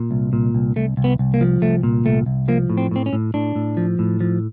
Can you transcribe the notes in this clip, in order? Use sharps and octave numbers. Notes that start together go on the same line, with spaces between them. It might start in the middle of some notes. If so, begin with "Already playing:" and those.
Already playing: A#2
C2
A#2
C2
C2 A3
C2
B3
C2
A#3
F3
C2 A3
A#2
C2 A3
C2
F3 A#3
A2
C4
A2 C4
C#4
A2
A2 D4
A2
F3
A2
F3